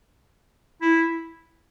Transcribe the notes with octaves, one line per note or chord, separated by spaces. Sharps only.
E4